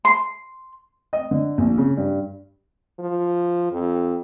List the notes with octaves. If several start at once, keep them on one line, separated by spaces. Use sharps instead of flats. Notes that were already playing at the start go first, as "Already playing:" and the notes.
C6
D#5
D3
A#1
C#3
G2
F3
F2